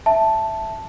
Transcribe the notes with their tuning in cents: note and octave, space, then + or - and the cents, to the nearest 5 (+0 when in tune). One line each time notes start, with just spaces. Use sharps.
E5 +0 A5 +0